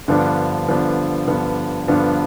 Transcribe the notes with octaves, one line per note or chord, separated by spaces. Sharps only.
G2 D3 F3 B3 D4
G2 D3 F3 B3 D4
G2 D3 F3 B3 D4
G2 D3 F3 B3 D4